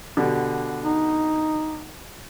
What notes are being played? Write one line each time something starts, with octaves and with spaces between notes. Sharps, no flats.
B2 D3 G4
D#4